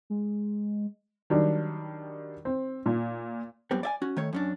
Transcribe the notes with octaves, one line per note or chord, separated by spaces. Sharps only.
G#3
D#3 F#3 G3 D4
C4
A#2
F#2 G3 B3 C4
D5 E5 G#5
C#4 F#4
D#3 A3 C#5
F#2 C#4 D4